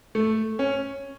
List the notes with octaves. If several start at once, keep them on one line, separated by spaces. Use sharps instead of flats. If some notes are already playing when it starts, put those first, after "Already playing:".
A3
C#4